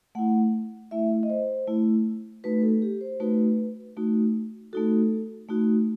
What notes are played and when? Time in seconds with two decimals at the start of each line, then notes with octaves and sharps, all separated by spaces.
0.15 A3 E4 F#5
0.91 A3 E4 E5
1.23 D#5
1.30 C5
1.67 A3 E4
2.44 A3 D#4 F#4 B4
2.63 A4
2.82 G4
3.01 C5
3.20 A3 D#4 F#4 B4
3.97 A3 D#4 F#4
4.73 A3 D#4 F#4 A4
5.49 A3 D#4 F#4